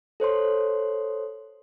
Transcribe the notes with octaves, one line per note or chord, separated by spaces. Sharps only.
A4 C5 C#5 C6